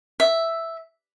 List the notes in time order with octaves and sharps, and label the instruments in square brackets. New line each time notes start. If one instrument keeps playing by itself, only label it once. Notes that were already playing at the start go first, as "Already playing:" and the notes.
[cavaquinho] E5